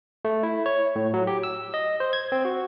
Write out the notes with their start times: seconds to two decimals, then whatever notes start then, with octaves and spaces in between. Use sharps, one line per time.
0.25 A3
0.43 E4
0.66 C#5
0.96 A2
1.14 F#3
1.27 G4
1.43 E6
1.74 D#5
2.00 C5
2.13 G#6
2.32 C4
2.45 F#4